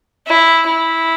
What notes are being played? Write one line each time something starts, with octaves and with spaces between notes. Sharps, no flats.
E4
E4